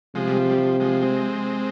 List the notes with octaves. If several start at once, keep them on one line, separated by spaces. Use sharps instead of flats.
C3 F3 G#3
G3
F3
G3
F3
F3 G#3
G#3 C4